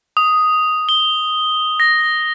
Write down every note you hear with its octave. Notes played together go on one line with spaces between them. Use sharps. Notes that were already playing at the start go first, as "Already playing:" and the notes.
D#6
G7
A#6